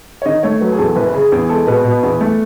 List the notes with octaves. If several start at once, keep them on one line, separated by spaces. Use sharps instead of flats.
C#5
D#3 D#5
A3 C#5
F#3 B4
G#4
E2 A4
F#1 B4
C#3 G#4
E2 G#4
G#3 A4
B2 B4
B2
E2
A3